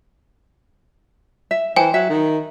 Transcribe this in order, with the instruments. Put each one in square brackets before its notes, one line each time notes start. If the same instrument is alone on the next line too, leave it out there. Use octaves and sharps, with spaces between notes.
[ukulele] E5
[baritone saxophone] E3 [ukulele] C5 [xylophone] G5 G#5
[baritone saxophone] F#3 [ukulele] E5
[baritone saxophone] D#3